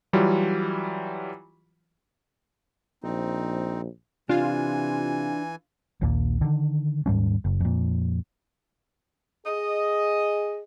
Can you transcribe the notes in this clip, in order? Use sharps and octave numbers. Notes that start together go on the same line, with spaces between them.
E3 F#3 G3 F4
A#1 C4 D#4
C3 E3 D4 F4 G#5
A#1 D#2 A#2
D3 D#3
D#2 G#2 G3 C#4
F#1
F2 A#2
G#4 D#5